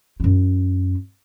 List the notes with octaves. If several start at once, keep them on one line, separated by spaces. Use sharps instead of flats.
F#2 E4